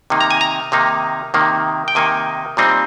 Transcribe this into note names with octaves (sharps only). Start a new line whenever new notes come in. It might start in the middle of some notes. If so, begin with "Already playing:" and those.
C3 D#3 A#3 D#4
A#5
G#5
A#5
C3 D#3 A#3 D#4
C3 D#3 A#3 D#4
G5
C3 D#3 A#3 D#4 G#5
A#2 G3 C4 D#4